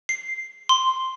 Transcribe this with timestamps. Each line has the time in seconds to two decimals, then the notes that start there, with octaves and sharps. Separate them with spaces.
0.09 C7
0.69 C6